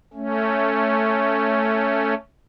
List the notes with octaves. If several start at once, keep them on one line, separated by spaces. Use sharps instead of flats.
A3 C#4